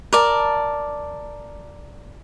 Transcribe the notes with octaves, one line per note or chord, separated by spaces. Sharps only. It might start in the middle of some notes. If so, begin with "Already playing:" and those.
A#4 D5 A5